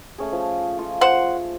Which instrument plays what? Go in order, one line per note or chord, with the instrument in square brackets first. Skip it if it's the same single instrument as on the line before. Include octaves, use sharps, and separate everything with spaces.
[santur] A3 C#4 G#4
F3
F4 C#6
[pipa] C5 F#5